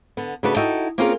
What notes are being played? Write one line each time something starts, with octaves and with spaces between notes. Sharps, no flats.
D3 B3
C#3 A3 D4 F#4 B4
D#4 E4 F#4 A4 D#5 G5
A#3 C4 C#4 F4 G#4 A#4